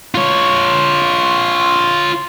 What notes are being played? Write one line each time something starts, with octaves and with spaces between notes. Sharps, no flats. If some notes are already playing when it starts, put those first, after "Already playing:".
F4 C#5